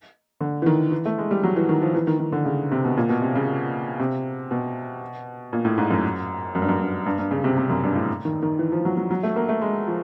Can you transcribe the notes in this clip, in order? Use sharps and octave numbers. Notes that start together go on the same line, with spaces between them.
D3
E3
D#3
E3
A3
G#3
G3
F#3
E3
D#3
F3
E3
D#3
D#3
D3
C#3
C3
B2
A#2
B2
C3
C#3
C3
B2
A#2
A2
G#2
F#2
F#2
G2
F#2
G2
G2
G2
C#3
C3
C3
F#2
G2
A2
D#3
D#3
E3
F3
F#3
F#3
F#3
A3
A#3
A3
G#3
F3